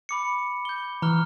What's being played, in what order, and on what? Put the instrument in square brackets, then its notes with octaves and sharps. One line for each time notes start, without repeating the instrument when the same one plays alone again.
[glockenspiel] B5 D6 C#7
G6 G7
[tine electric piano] E3 [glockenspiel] A#5 F6 G7